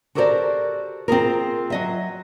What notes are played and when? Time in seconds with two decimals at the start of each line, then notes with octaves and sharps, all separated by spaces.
0.15 F#4 G4 A4 A#4 C5 D5
1.08 C4 F4 G#4 A#4
1.70 F#3 D#5 E5